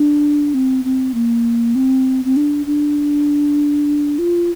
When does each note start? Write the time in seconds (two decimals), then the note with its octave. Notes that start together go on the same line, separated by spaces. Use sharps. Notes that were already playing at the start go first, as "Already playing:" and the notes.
Already playing: D4
0.54 C4
0.84 C4
1.14 A#3
1.75 C4
2.25 C4
2.37 D4
2.66 D4
4.19 F4